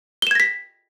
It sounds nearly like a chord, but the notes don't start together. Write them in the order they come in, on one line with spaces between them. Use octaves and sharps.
G7 E7 G#6 A#6 B6